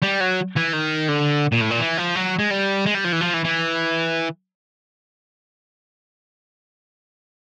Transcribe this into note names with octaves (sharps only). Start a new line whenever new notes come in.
G3
F#3
E3
D#3
D3
A#2
A2
A#2
E3
F3
F#3
G#3
G3
G#3
G3
F3
E3
F3
E3
E3